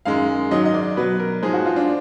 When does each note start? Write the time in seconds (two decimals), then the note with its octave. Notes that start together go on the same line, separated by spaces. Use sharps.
0.05 F#2 D#3 G#3 F5
0.51 G#2 D#3 F#3 D#5
0.65 D#5
0.74 D5
0.97 B2 F#3 B4
1.20 A#4
1.43 G#2 F3 G#3 G#4
1.54 F#4
1.66 F4
1.76 D4